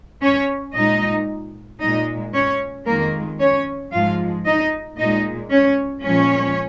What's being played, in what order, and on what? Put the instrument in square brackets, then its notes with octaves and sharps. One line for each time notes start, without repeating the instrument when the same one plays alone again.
[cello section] C#4 C#5
A#2 G#3 D#4 D#5
A#2 G#3 D#4 D#5
C#4 C#5
F2 D#3 G#3 A#3 A#4
C#4 C#5
G#2 F3 G#3 F4 F5
D#4 D#5
A#2 G#3 D#4 D#5
C#4 C#5
A#2 F3 G#3 C#4 C#5